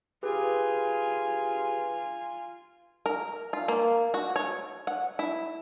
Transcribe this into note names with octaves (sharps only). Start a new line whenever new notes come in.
F4 G4 G#4 B4 G#5
A#4
F4
A#3
F#4
C#5
F#5
E4